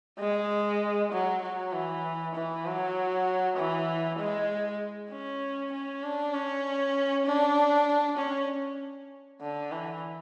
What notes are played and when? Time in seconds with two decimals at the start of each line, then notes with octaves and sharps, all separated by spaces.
0.19 G#3
1.12 F#3
1.42 F#3
1.72 E3
2.35 E3
2.65 F#3
3.57 E3
4.19 G#3
5.11 C#4
5.72 C#4
6.03 D4
6.34 C#4
7.26 D4
8.18 C#4
9.41 D3
9.72 E3